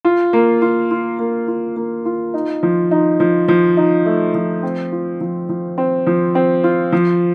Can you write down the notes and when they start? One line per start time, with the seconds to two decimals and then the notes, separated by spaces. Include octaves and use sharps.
0.05 F4
0.33 A#3
0.62 F4
0.91 F4
1.19 A#3
1.48 F4
1.76 A#3
2.05 F4
2.34 D#4
2.63 F3
2.91 D#4
3.20 F3
3.48 F3
3.77 D#4
4.06 A3
4.34 F3
4.63 C4
4.92 F4
5.21 F3
5.49 F3
5.78 C4
6.07 F3
6.35 C4
6.64 F4
6.92 F3